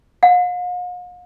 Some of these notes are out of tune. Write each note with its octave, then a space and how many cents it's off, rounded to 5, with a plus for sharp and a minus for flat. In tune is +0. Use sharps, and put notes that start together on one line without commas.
F5 +45